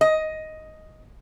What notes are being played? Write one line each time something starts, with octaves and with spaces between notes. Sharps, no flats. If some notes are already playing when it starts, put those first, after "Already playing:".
D#5